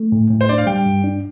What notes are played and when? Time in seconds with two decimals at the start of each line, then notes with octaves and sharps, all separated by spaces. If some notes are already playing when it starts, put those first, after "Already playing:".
Already playing: A3
0.12 A2
0.31 A2
0.41 C5
0.49 D4 D5
0.58 F5
0.67 G3 G5
0.86 G2
1.04 D4